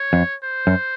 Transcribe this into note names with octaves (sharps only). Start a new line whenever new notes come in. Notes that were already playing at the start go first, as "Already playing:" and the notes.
Already playing: C#5
F2
C5
F#2